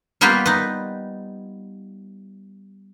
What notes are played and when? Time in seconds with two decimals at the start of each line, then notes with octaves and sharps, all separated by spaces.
0.21 G3 A#3 B3 F4 G4 B4
0.46 D#4 B4